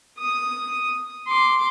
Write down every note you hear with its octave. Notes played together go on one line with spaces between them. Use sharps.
D#6
C6 D6